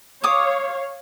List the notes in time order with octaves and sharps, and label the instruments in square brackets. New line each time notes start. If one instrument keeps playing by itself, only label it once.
[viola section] C#5 F5 [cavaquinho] D6 D#6